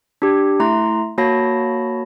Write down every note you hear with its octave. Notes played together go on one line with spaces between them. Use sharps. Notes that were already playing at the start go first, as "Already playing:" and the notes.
D4 G4
A3 E4 A#5 C6
A#3 F#4 C#5 A5 B5 A#6